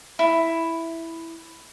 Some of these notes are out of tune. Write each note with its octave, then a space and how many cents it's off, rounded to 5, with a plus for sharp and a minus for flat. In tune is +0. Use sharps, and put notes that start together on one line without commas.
E4 +0